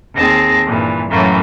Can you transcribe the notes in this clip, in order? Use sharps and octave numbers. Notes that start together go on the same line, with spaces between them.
D#2 C4 G#4 A5 A#6
G2 A#2 E3
F#2 A2 E3 A3 A#3